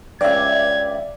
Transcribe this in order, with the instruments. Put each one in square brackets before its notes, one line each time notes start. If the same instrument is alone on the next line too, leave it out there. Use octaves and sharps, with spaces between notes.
[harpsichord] C#2 G2 [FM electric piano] D5 E5 [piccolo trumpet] G#6